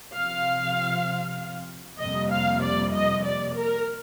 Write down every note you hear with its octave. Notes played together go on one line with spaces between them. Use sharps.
C3 F3 C4 F5
F2 C3 G3 A#3 D#5
F5
D5
D#5
D5
A#4